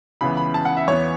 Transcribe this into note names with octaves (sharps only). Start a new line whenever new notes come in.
C#2 C#3 E3 B3 B5
B5
A5
F#5
E5
E2 E3 B3 C#5